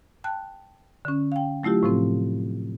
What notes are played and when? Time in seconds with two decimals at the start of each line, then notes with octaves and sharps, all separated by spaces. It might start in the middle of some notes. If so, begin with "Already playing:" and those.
0.24 G5 A5 F#6
1.05 D3 C#4
1.32 F5 G5
1.63 F#3 A3 E4 F4 G4
1.83 A2 C3 F3 C4